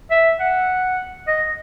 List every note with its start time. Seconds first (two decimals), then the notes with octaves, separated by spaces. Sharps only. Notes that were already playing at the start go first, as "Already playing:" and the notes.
0.11 E5
0.40 F#5
1.27 D#5